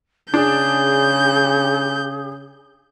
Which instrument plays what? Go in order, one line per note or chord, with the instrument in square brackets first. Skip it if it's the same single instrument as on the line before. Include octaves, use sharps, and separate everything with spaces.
[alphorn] C#3 [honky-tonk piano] D4 [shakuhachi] G#4 [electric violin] G6